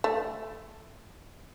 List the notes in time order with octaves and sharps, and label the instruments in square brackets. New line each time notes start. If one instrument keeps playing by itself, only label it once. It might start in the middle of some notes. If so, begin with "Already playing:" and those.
[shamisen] A3